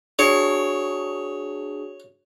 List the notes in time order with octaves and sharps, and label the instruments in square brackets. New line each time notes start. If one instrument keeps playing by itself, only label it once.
[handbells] D4 F#4 G#4 [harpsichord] C#5